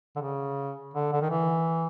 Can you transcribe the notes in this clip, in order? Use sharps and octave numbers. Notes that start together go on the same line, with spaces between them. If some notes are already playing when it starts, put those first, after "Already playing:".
D3
C#3
D3
D3
D#3
E3